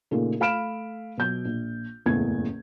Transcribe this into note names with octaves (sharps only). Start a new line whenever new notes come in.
A#2 C#3 A3 A#3 D#4 G#4
A3 F5 B5 F6 D7 E7
B2 F#3 G6
A#1
F#1 E2 A2 C#3 G#6